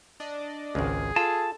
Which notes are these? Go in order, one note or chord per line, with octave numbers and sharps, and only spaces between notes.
D4 D5 D#5
G#1 C#2 G#4
F4 A4 A5